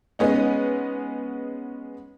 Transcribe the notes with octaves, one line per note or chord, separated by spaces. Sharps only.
G#3 B3 C#4 D#4